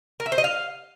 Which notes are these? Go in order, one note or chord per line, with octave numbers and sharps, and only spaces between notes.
A#4
E5
C5
D#5
F5